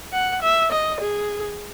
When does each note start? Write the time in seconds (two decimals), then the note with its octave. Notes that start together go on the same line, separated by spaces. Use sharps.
0.13 F#5
0.42 E5
0.72 D#5
1.01 G#4